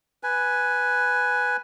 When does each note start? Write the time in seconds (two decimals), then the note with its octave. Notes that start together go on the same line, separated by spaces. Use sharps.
0.23 B4 G#5